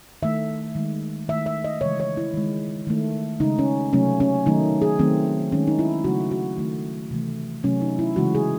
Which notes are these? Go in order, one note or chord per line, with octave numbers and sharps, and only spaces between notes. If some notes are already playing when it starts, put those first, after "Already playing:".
D#3 A3 E5
D#3 G#3
D#3 A3 E5
E5
D#5
C#3 E3 G#3 C#5
C#5
E4
D#3 G#3
D#3 A3
C#3 G#3 D#4
C#4
C3 F#3 A3 C#4
C#4
D#3 F#3 A3 D#4
G#4
D#3 F#3 A3 C4
D#3 G#3 C#4
D#4
E4
C#3 F#3 A3 F#4
F#4
D#3 A3
C3 E3 A3
C3 F#3 A3 C#4
D#4
E4
C#3 E3 G#3 F#4
G#4